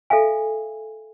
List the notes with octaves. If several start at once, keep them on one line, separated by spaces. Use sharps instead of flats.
A4 E5 F5 G#5